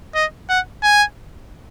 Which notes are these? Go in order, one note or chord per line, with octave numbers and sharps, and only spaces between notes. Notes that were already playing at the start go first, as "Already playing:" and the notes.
D#5
F#5
G#5